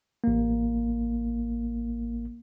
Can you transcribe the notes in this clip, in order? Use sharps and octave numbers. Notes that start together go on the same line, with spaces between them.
A1 A#3